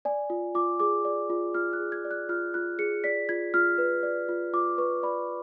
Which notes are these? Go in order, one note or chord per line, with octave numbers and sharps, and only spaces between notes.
D5 G#5
F4
F4 D6
G#4 D6
D5
F4
F4 F6
F#6
G#4
G#6
D5
F#6
F4 F6
F4 F#6
G#4 C#7
D5 B6
F4 G#6
F4 F6
B4
D5
F4
F4 D6
B4 C#6
D5 B5